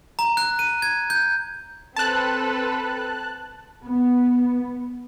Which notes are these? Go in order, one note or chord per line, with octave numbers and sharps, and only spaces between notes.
A#5
F#6
D#7
G#6
G6
C4 A4 B4 A5 F#6
B3